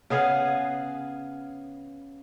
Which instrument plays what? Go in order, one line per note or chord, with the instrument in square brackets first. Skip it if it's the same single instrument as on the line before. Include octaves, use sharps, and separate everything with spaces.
[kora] C#3 B3 G#4 F5